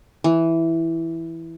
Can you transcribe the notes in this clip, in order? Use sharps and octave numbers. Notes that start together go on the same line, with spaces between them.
E3